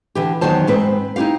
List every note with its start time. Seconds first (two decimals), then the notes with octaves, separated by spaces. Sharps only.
0.15 D3 E3 G4
0.41 E2 D#3 F#3 C5 A5
0.67 G#2 C4 B4
1.16 D#4 E4 F#4 G4 F5